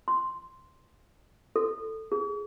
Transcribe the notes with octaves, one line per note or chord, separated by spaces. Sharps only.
C6
A4
G#4